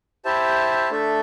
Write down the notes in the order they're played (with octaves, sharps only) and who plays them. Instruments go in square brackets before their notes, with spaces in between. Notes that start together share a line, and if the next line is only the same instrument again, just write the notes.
[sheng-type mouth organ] E4 G4 C5 E5 A5
A3 D4 A4 E5